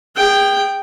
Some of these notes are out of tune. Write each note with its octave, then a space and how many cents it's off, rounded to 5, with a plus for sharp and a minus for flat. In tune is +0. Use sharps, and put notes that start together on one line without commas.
G#4 -30 G5 +0